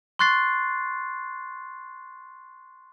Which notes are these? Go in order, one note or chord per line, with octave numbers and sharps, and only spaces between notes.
C6 C#6 F#6 A6 C7